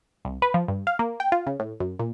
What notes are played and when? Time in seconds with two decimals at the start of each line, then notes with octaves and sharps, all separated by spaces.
0.25 C2
0.42 B4
0.54 F3
0.68 G2
0.87 F5
0.99 A#3
1.20 G5
1.32 F4
1.46 C#3
1.60 A2
1.80 F#2
1.99 A#2